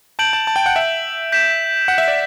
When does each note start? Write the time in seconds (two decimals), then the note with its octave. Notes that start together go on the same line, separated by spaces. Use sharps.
0.19 A5 G6 D7 F#7
0.33 A5
0.47 A5
0.56 G5
0.66 F#5
0.76 E5
1.32 G6 B6 E7
1.88 F#5
1.98 E5
2.08 D5